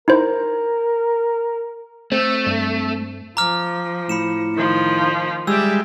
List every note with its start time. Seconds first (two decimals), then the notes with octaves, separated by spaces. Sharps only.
0.08 D#4 E4 A#4 C5
2.12 A3 C4
2.46 G2
3.37 F3 A#5 D6 F6
4.09 A2 B5 C#7 E7
4.55 D#3 F3
5.47 G3 G#3 G4 D5 E5 E6